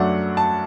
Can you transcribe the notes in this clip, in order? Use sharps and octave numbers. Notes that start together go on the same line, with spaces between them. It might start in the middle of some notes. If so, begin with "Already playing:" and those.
Already playing: F#2 F#3 A3 D4 F#5
A5